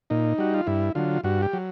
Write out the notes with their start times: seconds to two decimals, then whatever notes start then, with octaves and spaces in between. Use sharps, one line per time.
0.10 A#2 D#4
0.38 G3 F#4
0.54 F4
0.67 G2 E4
0.95 D3 F#3 F4
1.24 G2 F#4
1.42 G4
1.53 F#3